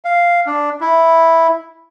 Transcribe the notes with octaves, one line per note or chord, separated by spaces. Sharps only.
F5
D4
E4